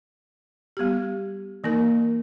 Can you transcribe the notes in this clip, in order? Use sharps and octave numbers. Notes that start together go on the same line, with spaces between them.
G3 B3 G4
E3 A#3 D#4 A#4